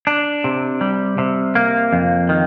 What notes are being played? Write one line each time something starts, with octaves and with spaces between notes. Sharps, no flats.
D4
C3
G3
C3
A#3
F2
D#3